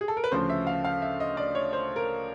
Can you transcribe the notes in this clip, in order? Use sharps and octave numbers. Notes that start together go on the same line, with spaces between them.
G#4
A4
A#4
B4
D2 C#3 F3 C5
E5
F5
F5
E5
D#5
D5
C#5
C5
A#4